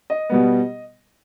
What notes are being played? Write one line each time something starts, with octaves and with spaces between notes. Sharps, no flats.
D#5
B2 G3 B3